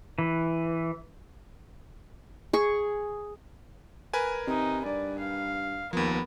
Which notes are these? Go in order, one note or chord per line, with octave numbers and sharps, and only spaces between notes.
E3
G#4 C#6
A#4 B4 G#5
C3 D#4
G2 D5
F5
D#2 F3 B3 A#4